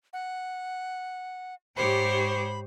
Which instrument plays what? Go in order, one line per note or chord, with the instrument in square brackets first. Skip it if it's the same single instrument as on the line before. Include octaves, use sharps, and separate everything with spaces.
[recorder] F#5
[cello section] G#2 G4 C#5 [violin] C5 [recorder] B5